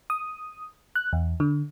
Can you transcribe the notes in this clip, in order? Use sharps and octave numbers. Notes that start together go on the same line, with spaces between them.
D#6
F#6
E2
D3